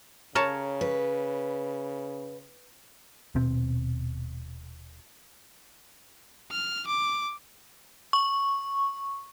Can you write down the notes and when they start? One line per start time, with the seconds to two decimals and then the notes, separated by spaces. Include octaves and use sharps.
0.35 C#3 A#4 C#5 A5
0.81 B4
3.35 D#1 B2 C4
6.51 F6
6.87 D6
8.13 C#6